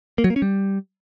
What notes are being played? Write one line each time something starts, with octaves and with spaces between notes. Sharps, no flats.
A#3
F#3
A#3
C#4
G3